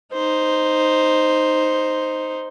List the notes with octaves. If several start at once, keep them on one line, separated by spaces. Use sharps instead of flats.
D#4 C5